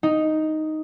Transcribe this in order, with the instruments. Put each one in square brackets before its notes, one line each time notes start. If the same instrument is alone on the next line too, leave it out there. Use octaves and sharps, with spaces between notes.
[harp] D#4